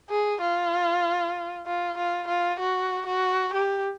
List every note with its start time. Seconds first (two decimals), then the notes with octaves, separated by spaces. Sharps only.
0.09 G#4
0.41 F4
1.66 F4
1.97 F4
2.28 F4
2.59 F#4
3.06 F#4
3.54 G4